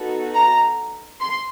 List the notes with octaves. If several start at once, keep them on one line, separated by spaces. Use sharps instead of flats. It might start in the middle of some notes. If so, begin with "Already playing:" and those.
Already playing: B3 D#4 F#4 A4
A#5
C6